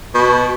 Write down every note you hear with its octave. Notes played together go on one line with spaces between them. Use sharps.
B2